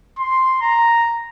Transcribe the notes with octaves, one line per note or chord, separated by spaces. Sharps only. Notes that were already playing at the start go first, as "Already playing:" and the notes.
C6
A#5